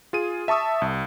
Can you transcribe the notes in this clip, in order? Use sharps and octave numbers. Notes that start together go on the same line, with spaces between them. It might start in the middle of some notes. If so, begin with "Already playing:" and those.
F4 G#4 D#7
E5 A5 C#6 D#6 E6
C2